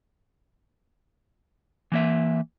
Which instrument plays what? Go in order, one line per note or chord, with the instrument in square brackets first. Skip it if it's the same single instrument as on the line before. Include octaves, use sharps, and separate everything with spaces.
[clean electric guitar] E3 A#3 E5